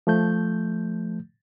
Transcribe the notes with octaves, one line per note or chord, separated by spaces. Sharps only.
F3 A3 G6